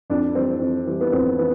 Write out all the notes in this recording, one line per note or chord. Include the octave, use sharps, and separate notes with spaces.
F2 D4
E3 G3 C4
F2
E3 G3
B3
F2 C4
E3 B3